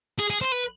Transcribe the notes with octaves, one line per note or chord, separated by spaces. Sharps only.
G#4
G#4
C5
B4